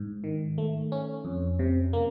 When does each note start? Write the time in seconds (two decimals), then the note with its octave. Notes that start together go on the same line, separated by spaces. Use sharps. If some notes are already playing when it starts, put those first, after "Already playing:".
Already playing: G#2
0.24 D#3
0.58 A3
0.92 C#4
1.25 F2
1.59 C3
1.93 A#3